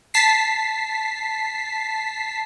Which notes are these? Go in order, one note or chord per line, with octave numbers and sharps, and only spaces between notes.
A5 B6 C7